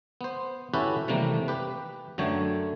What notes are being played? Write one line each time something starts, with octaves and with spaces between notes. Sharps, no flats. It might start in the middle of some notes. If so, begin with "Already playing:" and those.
B3 C5
C#4 E4 F#4 G4 A4 B4
C3 D#3 E3 G3 A3 A#3
G4 B4
F#2 D3 F#3 A3 C#5 G5